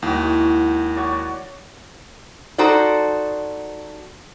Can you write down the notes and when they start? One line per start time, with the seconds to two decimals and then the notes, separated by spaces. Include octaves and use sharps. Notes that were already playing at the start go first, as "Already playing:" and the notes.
0.02 D#2 G#3 E4 F#4 G5
0.96 F#4 C#5 D5
2.58 D#4 F#4 A4 C5 D5